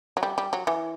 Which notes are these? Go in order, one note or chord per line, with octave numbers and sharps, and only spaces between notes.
F#3
G3
G3
F#3
E3